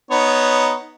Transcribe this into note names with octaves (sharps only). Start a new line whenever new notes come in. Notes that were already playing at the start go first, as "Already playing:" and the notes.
B3 D#4 C#5